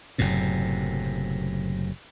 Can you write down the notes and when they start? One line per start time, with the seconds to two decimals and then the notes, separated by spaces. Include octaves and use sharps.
0.18 F#1 F#2 A2 C3